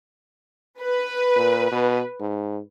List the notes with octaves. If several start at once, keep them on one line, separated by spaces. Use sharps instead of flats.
B4
A#2
B2
G#2